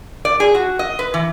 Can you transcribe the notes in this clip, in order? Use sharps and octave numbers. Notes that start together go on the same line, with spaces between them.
D5
G#4
F#4
D#5
B4
E3